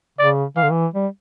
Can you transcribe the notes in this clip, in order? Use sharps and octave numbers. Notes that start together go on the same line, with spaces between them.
C#3 D5
E3 F5
D3
E3
G3